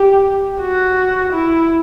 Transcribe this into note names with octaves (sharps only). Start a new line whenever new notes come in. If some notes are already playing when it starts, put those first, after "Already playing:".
Already playing: G4
F#4
E4